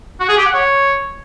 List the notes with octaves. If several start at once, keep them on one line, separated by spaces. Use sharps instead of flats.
F#4
G#4
G4
F#5
C#5